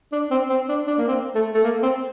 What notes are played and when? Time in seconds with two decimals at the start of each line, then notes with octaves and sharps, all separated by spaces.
0.12 D4
0.31 C4
0.49 C4
0.69 D4
0.87 D4
0.98 A#3
1.07 C4
1.35 A3
1.55 A3
1.64 A#3
1.83 C4